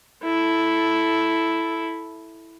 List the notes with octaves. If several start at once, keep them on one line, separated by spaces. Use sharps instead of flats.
E4 A4